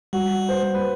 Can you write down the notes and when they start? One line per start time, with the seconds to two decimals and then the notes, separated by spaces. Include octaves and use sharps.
0.13 G3 F#4
0.49 C5
0.74 B4